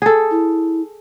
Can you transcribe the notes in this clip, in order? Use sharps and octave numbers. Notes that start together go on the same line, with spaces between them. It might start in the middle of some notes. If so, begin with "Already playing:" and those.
G#4 A4
E4